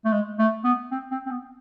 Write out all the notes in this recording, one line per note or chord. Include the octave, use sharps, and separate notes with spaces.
A3
G#3
A3
B3
C4
C4
C4
B3